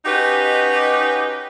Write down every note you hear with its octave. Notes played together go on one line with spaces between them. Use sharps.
C#4 D#4 F#4 G4 B4 D#5